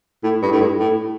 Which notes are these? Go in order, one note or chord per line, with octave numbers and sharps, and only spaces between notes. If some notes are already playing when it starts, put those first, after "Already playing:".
A2
G2
A2
G2
A2